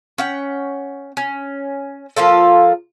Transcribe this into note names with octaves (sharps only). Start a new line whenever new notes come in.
C#4 F#5 G5
C#4
F3 A#3 F4 A4